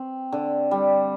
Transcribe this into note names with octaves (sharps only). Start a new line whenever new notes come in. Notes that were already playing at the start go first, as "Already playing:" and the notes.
Already playing: C4
D3
G3